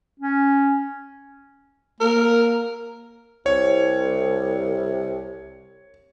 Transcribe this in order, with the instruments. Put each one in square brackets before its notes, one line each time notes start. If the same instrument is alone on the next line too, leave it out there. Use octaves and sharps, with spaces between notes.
[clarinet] C#4
[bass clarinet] A#3 [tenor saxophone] A#4
[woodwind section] C2 [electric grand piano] C#5